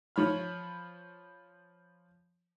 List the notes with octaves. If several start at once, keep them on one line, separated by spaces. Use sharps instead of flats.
F3 C#5 B5 F6